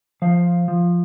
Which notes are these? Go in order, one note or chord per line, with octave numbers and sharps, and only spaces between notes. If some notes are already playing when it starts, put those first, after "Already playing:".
F3 F5
F3